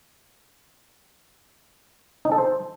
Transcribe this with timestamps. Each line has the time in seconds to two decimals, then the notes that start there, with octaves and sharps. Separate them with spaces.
2.25 D#4
2.32 A4
2.38 C5